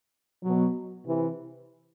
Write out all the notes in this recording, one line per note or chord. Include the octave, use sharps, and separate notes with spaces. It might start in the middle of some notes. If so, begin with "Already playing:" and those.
B2 F#3
C3 E3